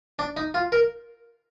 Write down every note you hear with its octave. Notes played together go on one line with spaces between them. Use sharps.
D4
D#4
F4
A#4